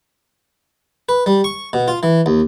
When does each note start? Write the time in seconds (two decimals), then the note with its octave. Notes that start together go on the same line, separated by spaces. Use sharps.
1.09 B4
1.26 G3
1.44 C#6
1.73 B2
1.88 F4
2.03 E3
2.26 D#2